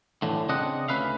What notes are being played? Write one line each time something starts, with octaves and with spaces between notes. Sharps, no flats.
A2 D3 E3
C#3 C4 D4 D#5 F#5
D2 C#4 B4 E5 F5